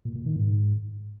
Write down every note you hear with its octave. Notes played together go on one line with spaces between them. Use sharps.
A#2
A#2
D#3
G#2